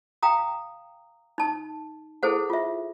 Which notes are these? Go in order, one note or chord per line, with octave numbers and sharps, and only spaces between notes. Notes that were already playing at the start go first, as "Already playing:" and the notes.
F5 G5 A#5 D#6
D#4 A5
E4 G#4 A4 C5 F#5
F4 E5